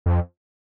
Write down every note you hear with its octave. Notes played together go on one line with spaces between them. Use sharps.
F2